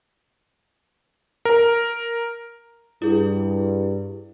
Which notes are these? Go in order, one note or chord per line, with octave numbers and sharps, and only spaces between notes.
A#4
G2 E4 G#4